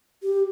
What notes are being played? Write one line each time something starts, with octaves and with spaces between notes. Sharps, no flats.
G4